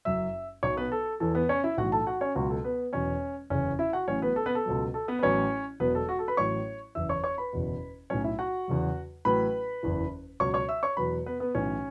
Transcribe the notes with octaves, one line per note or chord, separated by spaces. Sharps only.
F#1 F#2 F#3 E5 E6
B1 B2 F#3 C#5 C#6
B3 B4
A4
E2 E3 A4
B3 B4
C#4 C#5
E4 E5
B1 A2 E3 F#4 F#5
A4 A5
F#4 F#5
C#4 C#5
C#2 B2 F#3 F#4
A4
B3 B4
E1 E2 B2 F#3 C#4 C#5
F#1 E2 C#3 C#4 C#5
E4 E5
F#4 F#5
A1 A2 F#3 C#4 C#5
B3 B4
A4
B3 B4
A4
C#2 B2 F#3
A4
B3 B4
B4
A1 A2 F#3 C#4 C#5
E1 E2 B2 F#3 B3 B4
A4
F#4
A4
B4 B5
A1 A2 F#3 C#5 C#6
F#1 E2 E3 E5 E6
C#5 C#6
C#5 C#6
B4 B5
F#1 E2 B2
B1 A2 F#3 C#4 C#5
E4 E5
F#4 F#5
E2 C#3 F#3
A1 A2 F#3 B4 B5
F#1 E2 E3
C#2 B2 F#3 C#5 C#6
C#5 C#6
E5 E6
C#5 C#6
E2 B2 F#3 B4 B5
B3 B4
B3 B4
B1 A2 E3 C#4 C#5